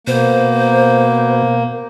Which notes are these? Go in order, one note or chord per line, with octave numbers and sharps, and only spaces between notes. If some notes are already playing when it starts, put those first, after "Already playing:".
B2 A#3 C5